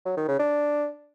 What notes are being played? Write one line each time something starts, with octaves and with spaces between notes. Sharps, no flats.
F#3
D#3
C#3
D4